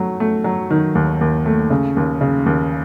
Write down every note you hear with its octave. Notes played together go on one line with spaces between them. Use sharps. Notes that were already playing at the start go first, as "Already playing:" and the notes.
Already playing: F#3 A3
A3
F#3
D#3
D#2
D#2
A3
C#3
D#2
C#3
D#2